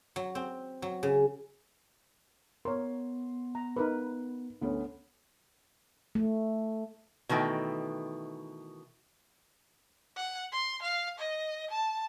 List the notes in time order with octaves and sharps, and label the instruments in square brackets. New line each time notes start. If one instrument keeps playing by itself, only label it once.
[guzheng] F#3
C4
F#3
C#3
[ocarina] B3 [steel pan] A#4 C#5 [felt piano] C6
[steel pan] A#5
D#4 A#4 B4
[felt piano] D2 B3 C#4
[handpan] A3
[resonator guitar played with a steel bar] B2 D#3 E3 A3 G5
[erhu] F#5
C6
F5
D#5
A5